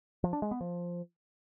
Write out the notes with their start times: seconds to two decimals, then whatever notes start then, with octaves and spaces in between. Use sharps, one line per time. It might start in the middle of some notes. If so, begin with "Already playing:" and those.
0.24 F3
0.33 D4
0.42 G#3
0.51 B3
0.61 F3